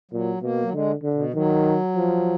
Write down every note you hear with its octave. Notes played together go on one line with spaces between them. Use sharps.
A#2 F#3
B2 A#3
F#3
D3 G#3
D3
B2
D#3 F#3
F3